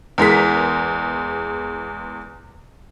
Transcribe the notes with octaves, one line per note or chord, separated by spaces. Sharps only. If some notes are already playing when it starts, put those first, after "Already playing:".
E2 G#3 A#4 B6